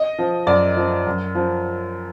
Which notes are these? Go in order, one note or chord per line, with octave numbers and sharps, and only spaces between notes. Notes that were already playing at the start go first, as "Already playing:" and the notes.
Already playing: D#5
F3
F#2 D5
F3
F#2
F3